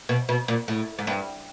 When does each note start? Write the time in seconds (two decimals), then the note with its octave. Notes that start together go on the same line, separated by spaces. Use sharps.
0.09 B2
0.29 B2
0.48 A#2
0.68 A2
0.99 G#2
1.07 G2